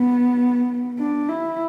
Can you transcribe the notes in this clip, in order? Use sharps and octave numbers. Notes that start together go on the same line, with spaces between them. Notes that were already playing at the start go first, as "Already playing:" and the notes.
Already playing: B3
D4
E4